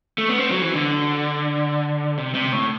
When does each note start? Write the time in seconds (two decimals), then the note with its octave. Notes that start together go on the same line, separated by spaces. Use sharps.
0.18 A3
0.29 B3
0.38 C4
0.51 F#3
0.62 E3
0.74 D3
2.17 C3
2.35 C3
2.52 A2